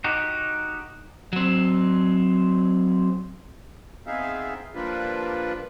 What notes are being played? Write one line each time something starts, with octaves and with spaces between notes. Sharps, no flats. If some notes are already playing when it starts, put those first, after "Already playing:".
D#4 F#4 G4
F#3 C4
B3 C4 D#4 G#4 E5 F5
F3 G3 A#3 D4 F4 B4